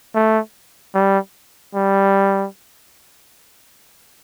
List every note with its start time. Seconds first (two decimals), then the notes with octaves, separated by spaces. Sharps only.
0.15 A3
0.95 G3
1.75 G3